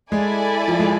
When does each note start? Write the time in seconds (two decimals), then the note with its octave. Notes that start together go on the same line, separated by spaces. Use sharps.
0.12 G#3 E4 A4 D5 G#5
0.68 F3
0.79 G#3